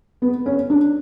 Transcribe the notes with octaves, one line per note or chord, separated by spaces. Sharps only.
B3
C#4
D4